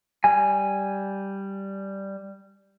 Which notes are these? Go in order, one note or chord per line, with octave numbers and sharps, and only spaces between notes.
G3 G#5